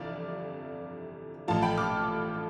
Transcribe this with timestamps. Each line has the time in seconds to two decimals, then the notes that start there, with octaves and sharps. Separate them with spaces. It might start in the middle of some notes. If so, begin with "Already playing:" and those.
Already playing: G1 F2 C3 E3 D5 F5
1.48 A1 A2 F3 F5 A5
1.62 G5 B5
1.77 D6 F6